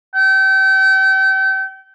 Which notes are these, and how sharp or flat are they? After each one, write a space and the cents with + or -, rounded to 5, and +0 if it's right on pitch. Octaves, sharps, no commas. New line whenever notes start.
G5 -35